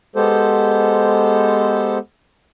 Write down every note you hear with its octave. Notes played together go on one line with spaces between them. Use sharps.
G#3 B3 G4 A4 C5